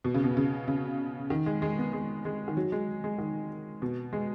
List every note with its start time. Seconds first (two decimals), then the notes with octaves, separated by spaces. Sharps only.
0.04 B2
0.15 C#3
0.24 B2
0.37 C#3
0.68 C#3
1.30 D#3
1.46 G#3
1.62 G#3
1.78 B3
1.93 G#3
2.25 G#3
2.48 D#3
2.57 F#3
2.72 G#3
3.04 G#3
3.18 D#3
3.82 B2
4.13 G#3